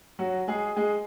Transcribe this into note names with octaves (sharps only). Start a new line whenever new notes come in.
F#3 F#4
G#3 G#4
G#3 G#4